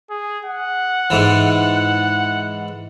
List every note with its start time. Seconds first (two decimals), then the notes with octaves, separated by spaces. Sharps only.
0.10 G#4
0.45 F#5
1.10 G#2 E3